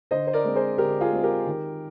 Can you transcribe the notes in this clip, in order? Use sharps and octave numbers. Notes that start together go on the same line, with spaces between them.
D3 C5 D#5
C5
A#4 D5
G#3 C4
G#4 C5
D3 G4 A#4
F4 G#4
G#3 C4
G4 A#4
D#3